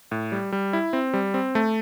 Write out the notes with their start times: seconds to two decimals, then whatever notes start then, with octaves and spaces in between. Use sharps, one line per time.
0.12 A2
0.32 G3
0.52 G3
0.73 E4
0.93 C4
1.14 G3
1.34 C4
1.55 A3